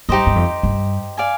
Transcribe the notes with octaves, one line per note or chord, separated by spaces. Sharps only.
G2 D#4 G4 C5 D#5
G2
F2
G2
D5 F5 G#5